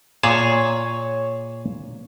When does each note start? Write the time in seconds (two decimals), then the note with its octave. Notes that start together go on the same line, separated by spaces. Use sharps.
0.23 A#2 G#4 C#5 A5